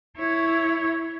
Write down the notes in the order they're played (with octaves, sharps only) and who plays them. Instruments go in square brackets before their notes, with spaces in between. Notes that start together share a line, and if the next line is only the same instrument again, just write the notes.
[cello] E4 C#5